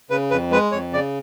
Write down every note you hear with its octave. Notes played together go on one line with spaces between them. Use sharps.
C#3 B4
F2 B4
G#3 B4
F2 C#5
C#3 D5